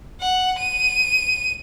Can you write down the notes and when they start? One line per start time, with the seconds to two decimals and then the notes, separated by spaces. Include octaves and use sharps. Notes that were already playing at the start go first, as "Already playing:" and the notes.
0.21 F#5
0.58 D#7